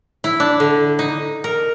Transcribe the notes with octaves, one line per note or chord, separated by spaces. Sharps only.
E4
D4
D3
D#4
A#4